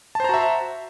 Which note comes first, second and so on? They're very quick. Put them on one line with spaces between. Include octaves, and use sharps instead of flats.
A5 C5 A#5 F#4 E5